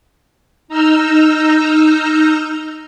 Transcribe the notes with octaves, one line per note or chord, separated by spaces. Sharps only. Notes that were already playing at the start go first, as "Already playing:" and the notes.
D#4 A#5 E6 F6 G6